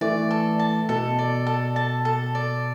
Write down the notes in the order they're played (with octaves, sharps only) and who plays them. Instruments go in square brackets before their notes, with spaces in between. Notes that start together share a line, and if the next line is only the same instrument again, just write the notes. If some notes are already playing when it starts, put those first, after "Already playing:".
[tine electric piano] E3 A3 [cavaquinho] D5
[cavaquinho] A4
A5
[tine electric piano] B2 [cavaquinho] A4
[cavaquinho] D5
A4
A5
A4
D5